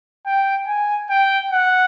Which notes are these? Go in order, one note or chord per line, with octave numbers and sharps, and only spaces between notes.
G5
G#5
G5
F#5